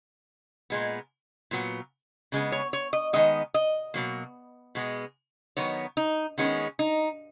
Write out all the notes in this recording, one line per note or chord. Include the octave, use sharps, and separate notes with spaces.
A#2 G#3 B3
A#2 F#3 B3
C#3 G#3 B3
C#5
C#5
D#5
D#3 G#3 B3 D#5
D#5
B2 F#3 A#3
B2 G#3 B3
D#3 F#3 B3 C#5
D#4
D#3 G#3 B3 C#4
D#4